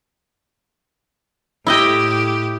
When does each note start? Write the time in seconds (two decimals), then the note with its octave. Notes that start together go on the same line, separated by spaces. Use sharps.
1.67 A2 E4 G4 D#5 G5